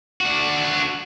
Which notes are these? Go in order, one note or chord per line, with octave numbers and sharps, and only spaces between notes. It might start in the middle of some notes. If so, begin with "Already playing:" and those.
D4 F#4